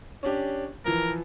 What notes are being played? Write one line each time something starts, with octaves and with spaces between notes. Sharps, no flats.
C#4 D4 G4
E3 F3 A#4